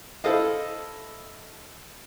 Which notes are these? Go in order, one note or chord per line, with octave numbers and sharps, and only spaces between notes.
E4 A4 C5 D#5 F5